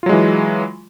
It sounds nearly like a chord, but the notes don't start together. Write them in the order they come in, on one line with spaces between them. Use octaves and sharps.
F4 F#3 G#3 E3